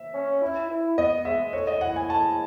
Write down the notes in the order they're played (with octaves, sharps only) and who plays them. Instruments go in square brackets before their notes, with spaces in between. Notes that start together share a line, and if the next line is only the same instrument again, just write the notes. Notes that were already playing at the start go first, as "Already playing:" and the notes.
Already playing: [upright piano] E5
[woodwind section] C#4
E4
E4
[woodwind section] B3 [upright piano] D#5
[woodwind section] G#3 [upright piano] E5
[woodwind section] A2 [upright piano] C#5
[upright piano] D#5
[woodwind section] E4 [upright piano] F#5
[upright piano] G#5
[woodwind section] G#3 [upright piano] A5